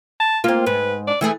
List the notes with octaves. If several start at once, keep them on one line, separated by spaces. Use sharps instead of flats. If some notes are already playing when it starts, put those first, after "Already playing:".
A5
A#3 C4 F4
G#2 B4
D5
E3 A3 E4 G#4